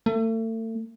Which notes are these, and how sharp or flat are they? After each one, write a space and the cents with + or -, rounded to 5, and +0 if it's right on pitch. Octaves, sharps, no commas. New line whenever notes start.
A3 +35